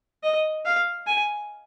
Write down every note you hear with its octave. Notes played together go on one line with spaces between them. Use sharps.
D#5
F5
G#5